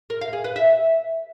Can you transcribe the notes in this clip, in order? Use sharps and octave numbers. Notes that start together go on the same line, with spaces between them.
A#4
F5
G#4
B4
E5